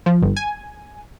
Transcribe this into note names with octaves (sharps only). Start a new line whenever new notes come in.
F3
G1
G#5